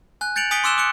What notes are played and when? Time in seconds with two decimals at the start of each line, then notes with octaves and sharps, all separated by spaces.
0.21 G#5 F#6
0.36 G6 A6 C#7 D7 F7 F#7
0.51 G#5 D#6 B6 C#7 D7 G7
0.64 C6 D6 E6 F#6 E7 G7
0.78 D6 F#6 C#7